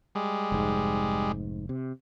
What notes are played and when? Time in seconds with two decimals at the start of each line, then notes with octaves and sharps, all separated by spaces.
0.15 G3 G#3
0.52 F1 G#2
1.69 C3